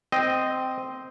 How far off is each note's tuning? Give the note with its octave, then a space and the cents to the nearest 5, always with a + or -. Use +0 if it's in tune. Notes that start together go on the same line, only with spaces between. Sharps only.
C4 -10 D#5 +0